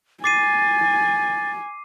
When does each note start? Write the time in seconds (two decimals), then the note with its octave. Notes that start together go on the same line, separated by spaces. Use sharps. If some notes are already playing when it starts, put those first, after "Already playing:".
0.24 G#5 D6 A6 C7 D#7